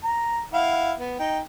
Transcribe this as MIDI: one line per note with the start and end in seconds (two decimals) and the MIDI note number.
0.04 0.41 82
0.53 0.93 64
0.53 0.93 77
0.53 0.93 78
0.99 1.19 59
1.20 1.39 63
1.20 1.39 79